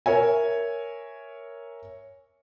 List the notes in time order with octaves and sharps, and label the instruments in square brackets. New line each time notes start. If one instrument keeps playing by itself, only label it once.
[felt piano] A#4 C#5 E5 G#5